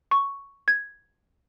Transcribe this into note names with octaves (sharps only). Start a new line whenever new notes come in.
C#6
G#6